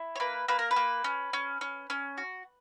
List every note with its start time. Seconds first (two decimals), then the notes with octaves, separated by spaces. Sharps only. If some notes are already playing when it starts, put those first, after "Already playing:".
Already playing: E4
0.16 C#5
0.20 A#3 B4
0.48 A#3 B4
0.59 A#4
0.71 B4
0.76 A#3
1.04 C#4
1.33 C#4
1.61 C#4
1.90 C#4
2.18 F#4